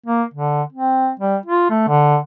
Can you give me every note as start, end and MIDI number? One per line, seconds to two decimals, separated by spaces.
0.06 0.23 58
0.34 0.62 50
0.72 1.10 60
1.19 1.36 55
1.46 1.69 65
1.70 1.88 57
1.88 2.17 50